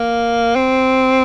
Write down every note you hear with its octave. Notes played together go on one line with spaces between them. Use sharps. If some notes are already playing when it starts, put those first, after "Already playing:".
Already playing: A#3
C4